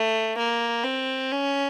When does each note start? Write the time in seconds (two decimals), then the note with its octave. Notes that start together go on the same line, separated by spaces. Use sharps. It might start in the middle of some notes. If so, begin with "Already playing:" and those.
Already playing: A3
0.37 A#3
0.84 C4
1.32 C#4